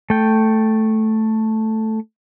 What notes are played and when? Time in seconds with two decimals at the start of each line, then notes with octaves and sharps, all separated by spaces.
0.10 A3 G5